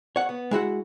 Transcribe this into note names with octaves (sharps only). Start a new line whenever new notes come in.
C#5 F#5
B3
G#3 E4 F#4 F#5